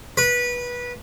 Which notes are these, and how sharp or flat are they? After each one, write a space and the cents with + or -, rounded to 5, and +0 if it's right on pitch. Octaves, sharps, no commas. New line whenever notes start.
B4 -20